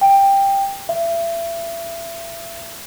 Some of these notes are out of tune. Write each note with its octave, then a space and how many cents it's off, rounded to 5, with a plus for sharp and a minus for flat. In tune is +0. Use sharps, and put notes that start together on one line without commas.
G5 +10
E5 +35